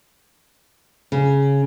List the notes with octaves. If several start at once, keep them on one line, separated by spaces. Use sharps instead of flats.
C#3